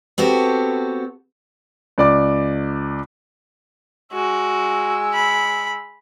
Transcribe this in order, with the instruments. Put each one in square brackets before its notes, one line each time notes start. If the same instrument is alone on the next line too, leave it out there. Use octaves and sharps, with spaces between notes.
[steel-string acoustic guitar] B3 C4 F#4 G4 A4
[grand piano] C#2 D5 D6
[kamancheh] G#3 E6 [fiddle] F#4
[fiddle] B5